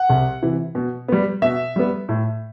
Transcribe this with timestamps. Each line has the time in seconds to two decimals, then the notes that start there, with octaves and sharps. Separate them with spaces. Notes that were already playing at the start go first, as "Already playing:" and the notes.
Already playing: F#5
0.10 C2
0.42 C3 E3
0.75 B2
1.08 G3 B3
1.42 B2 E5
1.76 G3 B3
2.09 A2